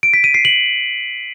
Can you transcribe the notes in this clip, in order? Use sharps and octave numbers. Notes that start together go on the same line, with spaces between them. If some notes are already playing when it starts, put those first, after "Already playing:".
D7
B6
D#7
C7
F#7